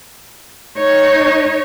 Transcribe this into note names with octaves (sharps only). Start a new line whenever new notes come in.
D#4 C#5